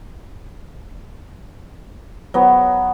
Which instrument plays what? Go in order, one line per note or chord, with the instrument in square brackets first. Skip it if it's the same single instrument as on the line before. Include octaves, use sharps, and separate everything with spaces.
[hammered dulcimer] F#3 B3